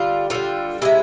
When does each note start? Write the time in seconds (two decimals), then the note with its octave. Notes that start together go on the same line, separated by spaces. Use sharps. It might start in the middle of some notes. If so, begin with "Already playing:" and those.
Already playing: D3 G3 F4
0.30 D3 G3 F4
0.82 C3 D#3 G#3 E4